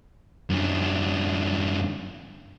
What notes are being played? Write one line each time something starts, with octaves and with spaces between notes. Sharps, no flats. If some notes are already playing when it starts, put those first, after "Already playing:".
F#2 D3